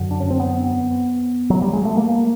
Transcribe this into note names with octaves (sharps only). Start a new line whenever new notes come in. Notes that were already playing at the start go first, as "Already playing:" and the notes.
Already playing: F#2 D3 F#3
D4
C#4
C4
B3
F#3
G3
G#3
A3
A#3